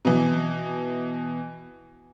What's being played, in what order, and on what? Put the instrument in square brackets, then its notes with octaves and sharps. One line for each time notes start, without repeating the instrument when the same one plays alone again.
[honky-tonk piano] B2 E3